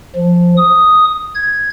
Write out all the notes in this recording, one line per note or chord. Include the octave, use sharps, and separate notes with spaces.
F3
D#6
G#6